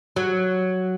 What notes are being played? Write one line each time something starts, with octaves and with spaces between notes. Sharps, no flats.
F#3